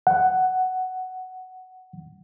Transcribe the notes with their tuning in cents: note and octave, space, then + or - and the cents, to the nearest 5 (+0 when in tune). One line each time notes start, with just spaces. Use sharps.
F#5 +10